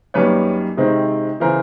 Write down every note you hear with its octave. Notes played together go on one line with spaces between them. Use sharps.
F#2 D#3 G3 A#3 B4 C#5
C3 D#3 G#3 C4
C#3 E3 A#4 C5